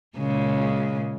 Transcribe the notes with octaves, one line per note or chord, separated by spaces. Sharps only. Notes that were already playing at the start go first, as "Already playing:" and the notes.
A#2 C#3 G#3